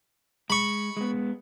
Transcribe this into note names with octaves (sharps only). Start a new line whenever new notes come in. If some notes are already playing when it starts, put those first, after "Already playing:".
G#3 B5 C#6
G#3 B3